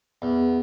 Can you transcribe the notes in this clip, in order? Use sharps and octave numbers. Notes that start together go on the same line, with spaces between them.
E2